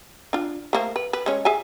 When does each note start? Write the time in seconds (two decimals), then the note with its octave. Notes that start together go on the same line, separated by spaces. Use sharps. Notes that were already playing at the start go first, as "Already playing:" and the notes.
0.33 D4 F4
0.73 A3 A#3 C5
0.96 B4
1.13 B4
1.26 G#3 C#4 C#5
1.45 G#4 E5 G#5